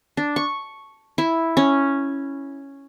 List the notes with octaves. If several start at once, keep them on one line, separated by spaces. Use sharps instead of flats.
D4
C#6
E4
C#4